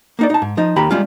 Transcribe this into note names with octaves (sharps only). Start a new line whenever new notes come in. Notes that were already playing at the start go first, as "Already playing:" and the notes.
A#3 D#4 D5
D#4 A5
G#2
F3 D#4
D#2 D#3 G4 A#5 B5
G3 G#3 C#4 F4